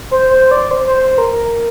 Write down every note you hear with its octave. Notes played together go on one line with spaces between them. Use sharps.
C5
C5
D5
C5
C5
C5
A#4
A#4